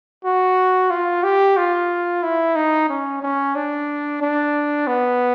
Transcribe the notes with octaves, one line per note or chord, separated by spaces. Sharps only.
F#4
F4
G4
F4
E4
D#4
C#4
C#4
D4
D4
B3